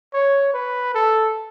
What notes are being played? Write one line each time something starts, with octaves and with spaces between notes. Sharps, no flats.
C#5
B4
A4